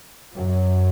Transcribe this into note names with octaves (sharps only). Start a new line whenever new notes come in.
F#2 F#3